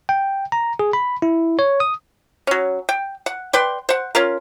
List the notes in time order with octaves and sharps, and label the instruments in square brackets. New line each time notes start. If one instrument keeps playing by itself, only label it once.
[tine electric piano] G5
A#5
G#4
B5
E4
C#5
D#6
[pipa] F#3 C#4
G5
F#5
B4 D5 G5 C6
C5 F#5
C#4 F4 A#4